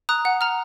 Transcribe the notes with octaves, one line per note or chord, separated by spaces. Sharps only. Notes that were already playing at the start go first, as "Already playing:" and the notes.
A#5 D#6 F#6
F#5
A#5 F6